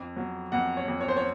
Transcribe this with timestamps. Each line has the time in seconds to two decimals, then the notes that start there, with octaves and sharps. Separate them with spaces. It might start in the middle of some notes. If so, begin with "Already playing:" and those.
Already playing: F2
0.17 F#3
0.52 F2 F#5
0.77 C#5
0.88 F2
1.01 C#5
1.08 C5
1.17 C#5